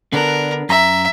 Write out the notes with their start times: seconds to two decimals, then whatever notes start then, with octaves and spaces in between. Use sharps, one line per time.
0.13 D3 B3 D4 A#4
0.69 F#2 E5 A#5